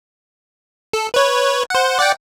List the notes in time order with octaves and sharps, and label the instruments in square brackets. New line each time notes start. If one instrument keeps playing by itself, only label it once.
[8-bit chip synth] A4
B4 C#5
C5 F#5
D5 F#5 G5